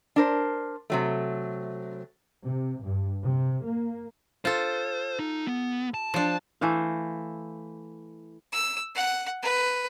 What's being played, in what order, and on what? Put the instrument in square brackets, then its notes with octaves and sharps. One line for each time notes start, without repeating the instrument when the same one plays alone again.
[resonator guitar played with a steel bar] D4 A#4 C5
C3 F#3 A3
[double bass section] C3
G2
C3
A#3
[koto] F4 A4 [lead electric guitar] C5
[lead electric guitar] D#4
B3
A5
[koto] F3 D4
[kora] E3 A3 C5 F5
[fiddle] E6
F#5
B4